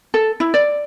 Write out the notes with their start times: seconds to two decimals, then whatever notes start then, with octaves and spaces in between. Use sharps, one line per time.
0.14 A4
0.40 E4
0.54 D5